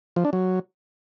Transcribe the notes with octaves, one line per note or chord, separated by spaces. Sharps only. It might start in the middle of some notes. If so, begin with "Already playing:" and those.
F3
D4
F#3